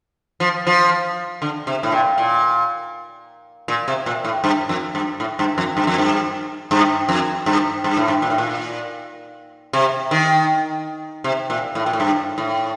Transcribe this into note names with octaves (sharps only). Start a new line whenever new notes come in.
F3
F3
D3
C3
A2
A#2
A#2
A#2
C3
A#2
A2
G2
F2
G2
A2
G2
F2
G2
F2
G2
G2
F2
G2
G2
A2
G2
A#2
A2
A#2
C3
D#3
C3
A#2
A2
A#2
A2
G2
A2